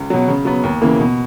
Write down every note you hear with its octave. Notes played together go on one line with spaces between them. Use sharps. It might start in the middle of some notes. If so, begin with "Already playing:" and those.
Already playing: C#2
B2 F#3
C#3
F#3 B3
D#2
C#3 E3 A#3
B2